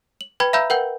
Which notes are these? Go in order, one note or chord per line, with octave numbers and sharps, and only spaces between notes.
F#7
B4 G5 B5 G#6
E5 F5 A#5 B5 E6 G6
A#4 B4 F#5 G5 G6